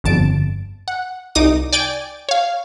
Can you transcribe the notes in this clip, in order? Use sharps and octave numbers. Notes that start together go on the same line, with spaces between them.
G1 F2 A5 D7
F#5
C2 D#4 D6 D#6 D#7
D5 G5 G#5 A6 D7
C#5 F5